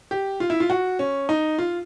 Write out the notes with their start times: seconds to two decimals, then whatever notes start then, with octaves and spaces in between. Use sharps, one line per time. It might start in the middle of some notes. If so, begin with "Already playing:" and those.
0.11 G4
0.40 F4
0.50 E4
0.60 F4
0.70 F#4
0.99 C#4
1.29 D#4
1.58 F4